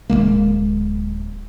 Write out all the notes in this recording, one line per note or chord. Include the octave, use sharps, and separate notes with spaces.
D1 E2 G#3 A#3